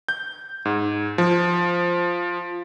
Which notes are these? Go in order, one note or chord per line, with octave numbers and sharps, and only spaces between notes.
G6
G#2
F3